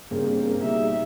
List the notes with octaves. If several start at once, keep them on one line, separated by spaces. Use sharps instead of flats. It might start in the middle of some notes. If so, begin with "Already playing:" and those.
G2 C#3 A#3 C4 G#4
B2 G3 D#4 E5